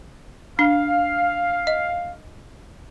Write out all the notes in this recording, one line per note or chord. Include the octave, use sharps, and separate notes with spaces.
D4 F5
D#5